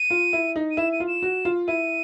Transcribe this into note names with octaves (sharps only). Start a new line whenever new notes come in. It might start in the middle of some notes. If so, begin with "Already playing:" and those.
Already playing: D#7
F4
E4
D#4
D#7
E4 E7
D#7
F4
E7
F#4
F4
E4 D#7